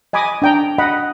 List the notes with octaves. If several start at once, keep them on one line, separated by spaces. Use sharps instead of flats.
D#5 G#5 B5 D6 D#6
D4 G5 A#5
D#5 F#5 B5